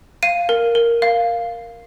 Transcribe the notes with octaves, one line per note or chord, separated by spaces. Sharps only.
F5 D#7
A#4
A#4
F5